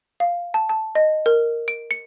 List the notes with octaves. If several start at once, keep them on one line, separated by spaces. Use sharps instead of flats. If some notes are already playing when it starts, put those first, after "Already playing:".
F5
A5
A5
D#5
A#4
D7
C#7